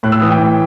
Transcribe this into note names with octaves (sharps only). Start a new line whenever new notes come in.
A2 F#6
E6
E3 D#6
G5
A2